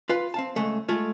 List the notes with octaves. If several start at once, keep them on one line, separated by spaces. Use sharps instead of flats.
F4 B4 F5
C4 F5 A5
C#2 G#3 A3
G#3 A3 F4